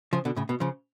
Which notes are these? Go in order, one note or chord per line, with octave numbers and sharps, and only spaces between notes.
C#3 F3
B2 D3
A2 C#3
B2
C#3 F3